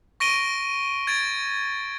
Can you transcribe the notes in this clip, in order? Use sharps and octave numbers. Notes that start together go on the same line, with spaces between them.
C#6 A#6 D7 D#7 G7
G#6 A6 D7